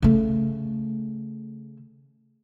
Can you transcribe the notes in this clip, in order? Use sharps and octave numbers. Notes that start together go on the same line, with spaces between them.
C#3 A3